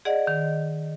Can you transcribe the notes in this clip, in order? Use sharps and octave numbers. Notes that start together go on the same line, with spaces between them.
G#4 D5 D#5 F#5
D#3